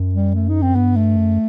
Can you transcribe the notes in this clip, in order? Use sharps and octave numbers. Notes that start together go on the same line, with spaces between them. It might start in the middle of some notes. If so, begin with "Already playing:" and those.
Already playing: F#2
G3
A3
D#4
C4
G2 B3
A3
F#2